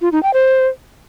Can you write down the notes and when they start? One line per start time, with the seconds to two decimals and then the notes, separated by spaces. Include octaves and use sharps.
0.01 F4
0.12 D#4
0.23 G5
0.34 C5